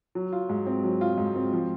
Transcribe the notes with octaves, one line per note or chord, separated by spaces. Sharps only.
F#3
F4
G#2
C4
F#3
F4
G#2
C4
F3